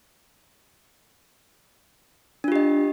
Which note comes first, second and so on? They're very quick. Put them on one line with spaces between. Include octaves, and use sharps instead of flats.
D4 F4 G4 D#5